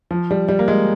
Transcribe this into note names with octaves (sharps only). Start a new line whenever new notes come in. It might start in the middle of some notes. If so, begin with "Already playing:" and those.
F3
G3
G3
A#3
G#3